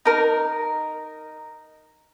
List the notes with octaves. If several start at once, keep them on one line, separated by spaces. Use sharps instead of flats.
D#4 A#4